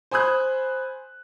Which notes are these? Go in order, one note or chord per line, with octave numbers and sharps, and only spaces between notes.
C5 G#5 B5 D#6 E6 F#6